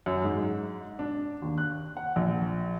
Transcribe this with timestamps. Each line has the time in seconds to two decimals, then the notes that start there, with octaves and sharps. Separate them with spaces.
0.06 F#2
0.24 G#2
0.99 D4
1.42 D#2
1.58 F#6
1.97 F#5
2.16 A#1